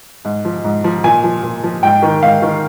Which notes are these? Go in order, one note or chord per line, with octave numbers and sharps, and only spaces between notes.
G#2
F3
G#2
F3
A#2 G#5
F3
A#2
F3
G#2 G5
D#3
G#2 F5
D#3